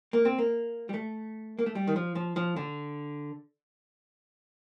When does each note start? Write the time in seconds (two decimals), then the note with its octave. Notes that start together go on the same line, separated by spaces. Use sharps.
0.13 A#3
0.25 C4
0.38 A#3
0.89 G3
0.94 A3
1.59 A#3
1.66 A3
1.75 G3
1.87 D#3
1.96 F3
2.15 F3
2.36 F3
2.56 D3